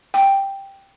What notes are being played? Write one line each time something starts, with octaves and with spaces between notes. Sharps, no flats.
G5